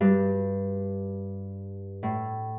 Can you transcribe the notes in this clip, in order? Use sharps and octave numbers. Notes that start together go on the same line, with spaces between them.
G2
A2